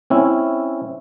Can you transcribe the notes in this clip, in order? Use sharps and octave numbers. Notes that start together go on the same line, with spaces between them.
C4 C#4 E4